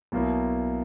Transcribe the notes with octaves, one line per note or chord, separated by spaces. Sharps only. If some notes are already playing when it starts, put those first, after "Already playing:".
B1 B2 A#3 E4